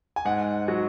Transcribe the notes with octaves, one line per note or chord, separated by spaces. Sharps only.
G#5
G#2 F#5
F#3